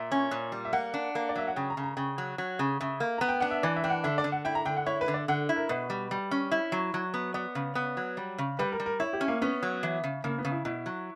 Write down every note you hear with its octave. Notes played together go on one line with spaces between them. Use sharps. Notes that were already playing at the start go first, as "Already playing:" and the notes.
Already playing: A#2 E5
C#4
A#2
G3
E5
A#3 F#5
D4
A#3
D5
F#3 E5
F#5
C#3 G5
A#5
C#3
A#5
C#3 G5
F#3
F#3
C#3
C#3 E5
A#3
B3 A#5
G5
D4 F#5
E5
E3 D5
E5
D4 G5
F#5
D3 E5
D5
D3
F#5
E4 G5
A#5
D3 G5
F#5
E4 C#5
B4
D3
D5
D3 F#5
E4
A#4
B2 B4
G3
G3
C#4
E4
F#3
F#3
B3
B3 D5
C#3
B3
F#3
G3
C#3
G3 B4
A#4
G3
A#4
E4 C#5
G4
C#4
A#3
B3 C#4
F#3
E3
C#3
C#3 A#3
B3
C#3
E4
B2 E4
F#3